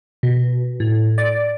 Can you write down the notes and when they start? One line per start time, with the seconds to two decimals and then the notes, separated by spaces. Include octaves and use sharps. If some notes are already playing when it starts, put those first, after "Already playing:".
0.23 B2
0.80 A2
1.18 D5